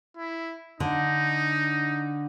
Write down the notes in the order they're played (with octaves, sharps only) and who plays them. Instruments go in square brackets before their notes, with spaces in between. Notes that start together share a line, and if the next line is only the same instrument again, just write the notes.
[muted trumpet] E4
[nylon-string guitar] D3 [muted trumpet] D#4